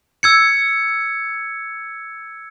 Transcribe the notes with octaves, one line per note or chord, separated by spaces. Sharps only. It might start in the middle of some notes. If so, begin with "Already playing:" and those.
E6 G#6 C#7